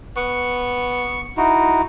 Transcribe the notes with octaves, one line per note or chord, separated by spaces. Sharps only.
B3 C#6
D#4 E4 F#4